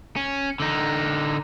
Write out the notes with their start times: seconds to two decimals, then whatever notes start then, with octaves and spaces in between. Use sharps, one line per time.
0.16 C#4
0.60 D3 D#4